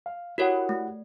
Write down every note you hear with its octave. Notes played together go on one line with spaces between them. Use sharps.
F5
E4 F#4 G4 A#4 C#5 F#5
A3